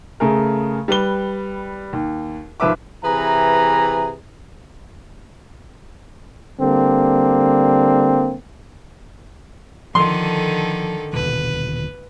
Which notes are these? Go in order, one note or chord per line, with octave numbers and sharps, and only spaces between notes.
C#3 A3 G#4 A#4
G3 B4 G7
D#2
G#1 F3 B4 E5 D6
C3 E3 G#4 B4 A#5
D3 G3 A#3 C4
D3 D#3 F3 A4 C6
D#1 B2 D3 B4